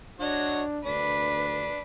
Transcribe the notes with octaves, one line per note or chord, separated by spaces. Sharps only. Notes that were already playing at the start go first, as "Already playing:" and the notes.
D4 F#4 C#5 D#5
D2 D4 B4